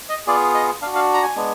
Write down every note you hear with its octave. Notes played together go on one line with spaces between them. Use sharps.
D#5
B3 F4 G#4 D5
D#5
D4 F#4 F5
F5
A#5
G#5
G#3 B3 D4